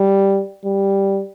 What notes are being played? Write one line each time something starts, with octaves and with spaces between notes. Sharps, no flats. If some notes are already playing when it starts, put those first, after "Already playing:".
Already playing: G3
G3